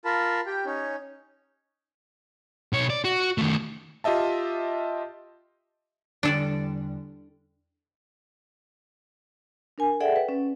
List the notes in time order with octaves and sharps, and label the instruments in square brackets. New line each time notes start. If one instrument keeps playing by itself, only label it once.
[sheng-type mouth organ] F4 A#4 A5 B5
G4 G5
C#4 D#4 C#5
[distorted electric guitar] B2 C#5
D5
F#4
D#3 A3
[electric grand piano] F4 G4 D#5 E5 A5
[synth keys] E2 D3 G3 [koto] D4 A4 D5
[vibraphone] D4 A#4 G#5
G#4 A4 D5 E5 F#5 G5
B4
C#4